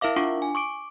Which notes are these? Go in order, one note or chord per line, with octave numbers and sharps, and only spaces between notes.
E4 A#4 E5 F5 D6
D4 F4 F#5 C#6 D6
G#5
C#6 D6 D7